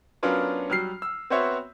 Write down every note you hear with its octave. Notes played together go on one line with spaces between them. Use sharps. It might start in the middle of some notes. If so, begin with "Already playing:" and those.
F#3 B3 C#4 D4 F4 A#4
F#3 G3 F6 C7
E6
B3 C4 F#4 C5 C#5 E5